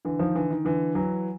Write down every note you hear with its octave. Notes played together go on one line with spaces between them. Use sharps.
D3 E3
D#3 F3
D3 E3
D#3
D3 E3
E3 F#3